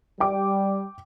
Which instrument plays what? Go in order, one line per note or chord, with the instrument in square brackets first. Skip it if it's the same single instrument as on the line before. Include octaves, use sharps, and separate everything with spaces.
[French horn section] G3 [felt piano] G5 D6